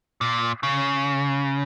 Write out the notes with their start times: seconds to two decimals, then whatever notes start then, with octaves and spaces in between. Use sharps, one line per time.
0.21 A#2
0.63 C#3